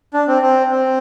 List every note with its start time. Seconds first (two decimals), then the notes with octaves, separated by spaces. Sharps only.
0.14 D4
0.28 C4
0.42 C4
0.71 C4